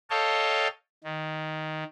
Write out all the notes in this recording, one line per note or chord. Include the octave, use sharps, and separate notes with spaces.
A4 C#5 D#5 F5 G5 A5
D#3